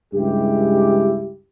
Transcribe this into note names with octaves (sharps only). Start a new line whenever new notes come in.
C#2 G2 G#3 E4 G4